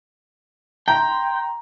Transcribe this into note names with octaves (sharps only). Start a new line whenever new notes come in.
G5 A#5 C6